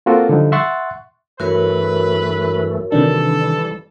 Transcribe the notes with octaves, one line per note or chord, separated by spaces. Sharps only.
A#3 C4 F4 F#4 A4 A#4
D3 F3 G3 D#4
E5 F#5 C6 C#6 F#6 A6
G2 E3 A3 F#4 A#4 B4 C#5
C3 D#3 E3 G3 D4 A4